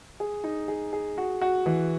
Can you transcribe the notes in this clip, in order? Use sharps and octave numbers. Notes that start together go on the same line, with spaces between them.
G#4
D#4
G#4
G#4
F#4
F#4
E3